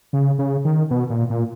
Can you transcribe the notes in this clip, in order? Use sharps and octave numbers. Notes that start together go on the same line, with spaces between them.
C#3
C#3
D#3
B2
A#2
A#2